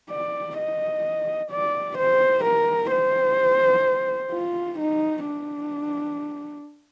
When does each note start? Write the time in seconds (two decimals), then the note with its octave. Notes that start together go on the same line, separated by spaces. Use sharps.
0.10 D5
0.58 D#5
1.51 D5
1.98 C5
2.45 A#4
2.91 C5
4.32 F4
4.79 D#4
5.26 D4